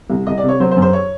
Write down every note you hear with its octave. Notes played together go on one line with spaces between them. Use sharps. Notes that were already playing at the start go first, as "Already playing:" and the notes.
C2
C2 D#5
D5
C3
C#5
F#3 C5
C5
F#2
C5
C#5